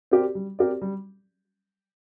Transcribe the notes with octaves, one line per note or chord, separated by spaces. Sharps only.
C4 G4 A#4 D5
G3
C4 G4 A#4 D5
G3